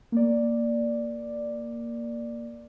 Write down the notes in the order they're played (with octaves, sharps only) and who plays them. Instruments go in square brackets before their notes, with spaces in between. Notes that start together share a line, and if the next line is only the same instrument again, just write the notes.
[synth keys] A#3 D5